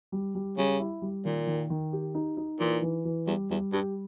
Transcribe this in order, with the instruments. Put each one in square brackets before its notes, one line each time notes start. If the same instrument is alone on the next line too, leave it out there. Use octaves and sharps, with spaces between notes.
[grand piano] G3
G3
[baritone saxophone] C#3 [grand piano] G3
[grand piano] E4
G3
[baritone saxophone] A#2 [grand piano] D#3
[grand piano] D#3
D#3
G4
D#4
D#4
[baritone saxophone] A#2 [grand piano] E3
[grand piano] E3
E3
[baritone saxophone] E2 [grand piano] G3
[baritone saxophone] E2 [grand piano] G3
[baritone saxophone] G2 [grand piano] G4